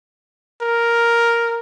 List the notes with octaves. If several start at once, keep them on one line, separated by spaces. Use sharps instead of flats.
A#4